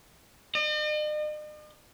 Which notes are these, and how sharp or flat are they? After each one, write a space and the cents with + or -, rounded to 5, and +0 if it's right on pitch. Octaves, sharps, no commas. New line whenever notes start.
D#5 -45